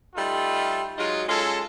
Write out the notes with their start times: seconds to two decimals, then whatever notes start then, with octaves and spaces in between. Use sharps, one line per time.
0.15 G3 A3 D#4 F4 A4
0.98 F#3 G#3 D#4 F4
1.28 G#3 C#4 F4 A4